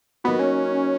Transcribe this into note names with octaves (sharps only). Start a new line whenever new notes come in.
F#3 A#3 B3 D#4 F#4
C#4